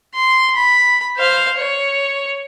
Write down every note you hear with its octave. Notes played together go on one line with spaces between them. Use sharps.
C6
B5
C5 F5
C#5